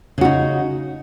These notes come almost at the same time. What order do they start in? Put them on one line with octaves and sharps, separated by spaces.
C#3 F#4 D#4